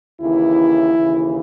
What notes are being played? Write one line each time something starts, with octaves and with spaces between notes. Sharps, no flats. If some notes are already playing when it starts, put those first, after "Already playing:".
D#2 C#3 E3 E4
D#2 C#3 E3